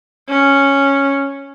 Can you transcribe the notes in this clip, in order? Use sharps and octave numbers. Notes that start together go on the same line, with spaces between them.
C#4